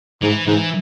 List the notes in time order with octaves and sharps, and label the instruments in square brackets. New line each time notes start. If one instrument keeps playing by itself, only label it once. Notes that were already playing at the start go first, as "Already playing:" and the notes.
[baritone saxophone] G#2 [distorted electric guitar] E3
[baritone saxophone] G#2 [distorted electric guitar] E3